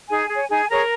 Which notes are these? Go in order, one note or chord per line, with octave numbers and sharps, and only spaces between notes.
D#4 G#4 G#5
G#4 C#5
D#4 G#4 G#5
G#4 A#4 C#5 A#5